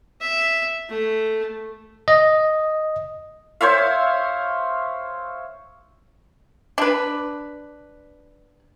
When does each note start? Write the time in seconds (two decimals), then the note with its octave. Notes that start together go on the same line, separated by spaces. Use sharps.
0.21 E5
0.89 A3
2.08 D#5
3.61 C5 C#5 E5 F5
6.78 D4 B4